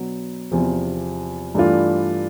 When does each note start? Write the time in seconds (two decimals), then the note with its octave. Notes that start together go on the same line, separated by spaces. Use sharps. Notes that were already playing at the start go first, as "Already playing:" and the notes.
Already playing: B2 F#3 B3 D4
0.52 E2 C3 F3
1.55 G2 E3 A3 D4 F4